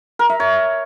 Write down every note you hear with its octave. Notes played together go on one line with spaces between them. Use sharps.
A#4
E5
C#5